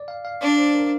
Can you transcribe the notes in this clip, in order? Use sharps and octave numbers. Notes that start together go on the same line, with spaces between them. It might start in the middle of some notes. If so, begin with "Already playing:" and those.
Already playing: D5
F5
F5
D4 D5
C5
A#4